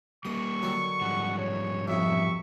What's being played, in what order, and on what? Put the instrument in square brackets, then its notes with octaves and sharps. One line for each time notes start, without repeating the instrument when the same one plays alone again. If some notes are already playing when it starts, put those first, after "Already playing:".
[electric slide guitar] G3 A#3 [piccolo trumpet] C#6 [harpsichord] D#6
[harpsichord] D3 D#3 F#3
[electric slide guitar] G#2 F3 G3 [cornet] F#5
[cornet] C#5
[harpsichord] B1 F2 C3 [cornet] E5 [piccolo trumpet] C#6